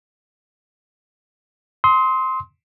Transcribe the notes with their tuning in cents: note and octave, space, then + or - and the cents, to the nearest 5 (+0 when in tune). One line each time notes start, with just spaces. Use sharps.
C6 +0 D#6 +40